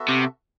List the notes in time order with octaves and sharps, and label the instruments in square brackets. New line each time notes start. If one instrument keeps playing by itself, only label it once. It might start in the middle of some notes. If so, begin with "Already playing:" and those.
Already playing: [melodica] B3 F#4 A4 E5
[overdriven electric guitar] C3